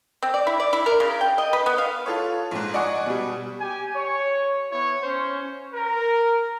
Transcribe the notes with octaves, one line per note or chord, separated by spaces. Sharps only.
C4
D5
E4
D5
E4
A#4
C#3
G5
D#5
B4
B3
F5
F4 A4 C#5
A#1 G#2
D5 D#5 F#5 G#5 C#6
B2 G3
G4 G#5
C#5
B3 E4 C#5
C#4 C5
A#4